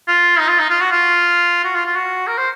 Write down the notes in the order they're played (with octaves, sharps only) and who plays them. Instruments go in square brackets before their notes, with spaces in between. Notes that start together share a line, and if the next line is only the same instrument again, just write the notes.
[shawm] F4
D#4
F4
D#4
F4
F#4
F4
F#4
F4
F4
F#4
A#4
C5